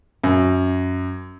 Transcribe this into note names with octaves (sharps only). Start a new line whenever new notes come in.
F#2